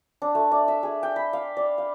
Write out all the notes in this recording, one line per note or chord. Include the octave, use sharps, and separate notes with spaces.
D4
A3
D5
E5
G#4
G5
B5
F5
D5
F5